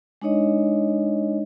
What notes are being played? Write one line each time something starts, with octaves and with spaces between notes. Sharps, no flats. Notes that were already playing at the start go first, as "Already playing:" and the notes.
G#3 D4 D#4 C#5 D#5